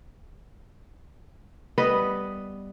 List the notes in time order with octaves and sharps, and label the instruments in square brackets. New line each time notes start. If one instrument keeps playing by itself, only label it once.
[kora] G3 B3 B4 D#5